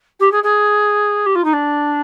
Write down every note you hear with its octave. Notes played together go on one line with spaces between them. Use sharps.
G4
G#4
G#4
G4
F4
D#4
D4